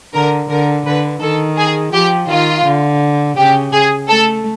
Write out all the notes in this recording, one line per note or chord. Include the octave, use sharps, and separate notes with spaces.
D3 A#4
D3 A#4
D3 B4
D#3 A4
G#4
F3 G4
D#3 F4
D3
C#3 G4
G#4
A3 A4